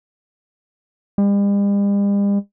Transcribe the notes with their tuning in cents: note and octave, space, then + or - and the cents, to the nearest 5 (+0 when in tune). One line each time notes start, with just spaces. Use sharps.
G3 +45